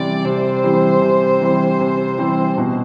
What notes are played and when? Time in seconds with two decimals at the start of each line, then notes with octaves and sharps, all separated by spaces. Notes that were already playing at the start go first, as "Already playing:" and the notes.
Already playing: C3 E3 G3 C4 D5
0.24 C3 C5
0.64 E3 G3 C4
1.02 C3
1.41 E3 G3 C4
1.80 C3
2.18 E3 G3 C4
2.58 B2